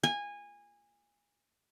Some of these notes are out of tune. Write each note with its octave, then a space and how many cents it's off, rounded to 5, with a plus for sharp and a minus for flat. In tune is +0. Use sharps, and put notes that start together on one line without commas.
G#5 -20